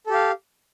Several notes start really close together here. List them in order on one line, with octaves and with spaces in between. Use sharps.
A4 G4 F5